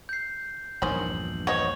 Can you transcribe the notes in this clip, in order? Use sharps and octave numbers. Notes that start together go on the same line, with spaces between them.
G6 C7
A#1 E2 G2 D#3 C#4 C5 F#7
C5 C#5 D#5 F#5